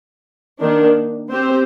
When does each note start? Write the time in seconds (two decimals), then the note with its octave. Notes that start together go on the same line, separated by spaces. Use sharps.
0.60 D#3 A#3 D4
1.29 C4 G4 C5